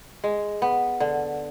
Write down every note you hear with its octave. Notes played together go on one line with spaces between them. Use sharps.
G#3
B3
D3